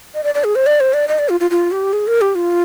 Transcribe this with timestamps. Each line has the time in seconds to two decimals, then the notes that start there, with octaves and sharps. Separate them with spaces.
0.14 D#5
0.24 D5
0.35 D5
0.44 G#4
0.55 C5
0.66 D5
0.80 C5
0.93 D5
1.08 D#5
1.19 D5
1.29 F4
1.40 F4
1.51 F4
1.72 G4
1.93 G#4
2.07 A#4
2.21 G4
2.35 F4